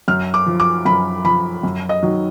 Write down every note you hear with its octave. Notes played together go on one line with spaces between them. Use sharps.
F#2 F6
D6
F3
D6
F#2 B5
F3 B5
F#2
D#5
D#3 F#3